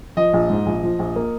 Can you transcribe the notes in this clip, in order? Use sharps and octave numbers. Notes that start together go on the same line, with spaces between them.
F3 D#5
A#1
G#2
A#1
F3
A#1
A#3